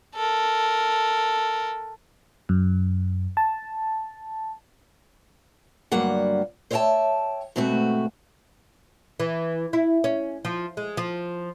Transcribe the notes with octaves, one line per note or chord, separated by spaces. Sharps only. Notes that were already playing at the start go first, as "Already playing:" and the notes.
A4 A#4
F#2
A5
D2 G2 F#3 G3 A#3 F#5
C5 C#5 E5 F5 G5 A5
G#2 B2 A3 C4 F#4
E3
E4
C#4
F3
G#3
F3